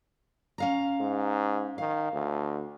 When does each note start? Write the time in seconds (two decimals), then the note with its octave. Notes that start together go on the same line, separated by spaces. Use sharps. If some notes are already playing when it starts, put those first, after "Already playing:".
0.58 C#4 F5 A#5
0.99 G#2
1.78 D#3 F5
2.13 D2